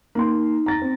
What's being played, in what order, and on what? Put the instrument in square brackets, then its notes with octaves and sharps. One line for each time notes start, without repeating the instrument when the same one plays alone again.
[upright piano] A#3 C6 [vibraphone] D#4
[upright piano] A#5 A6 A#6
C4